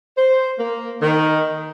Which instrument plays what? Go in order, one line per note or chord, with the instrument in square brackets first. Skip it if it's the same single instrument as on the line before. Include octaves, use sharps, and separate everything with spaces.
[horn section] C5
A#3
D#3